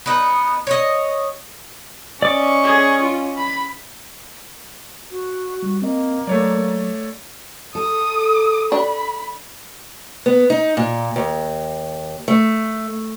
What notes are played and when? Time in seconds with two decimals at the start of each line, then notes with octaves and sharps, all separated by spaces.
0.06 B3 D#4
0.67 C#5 D#5
2.22 C#4 D5 D#5 C#6 D6
2.64 G#4
3.01 F4
3.36 B5
5.11 F#4
5.63 G3
5.82 A#3 C4 D#5
6.27 F#3 A3 C#5 D5
7.75 A4 D#6
8.72 D4 B5
10.26 B3
10.50 D#4
10.77 A#2
11.16 D#2
12.28 A3